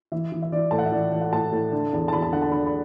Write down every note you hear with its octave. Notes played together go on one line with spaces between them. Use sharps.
E3 E5
E3
E5
E3 D5
A2 A5
F#5
E5
E3 D5
E3
F#5
A2 A5
A2
D3
E2
A5
E2 B5
A5
D3 F#5
A5
D3 B5
B5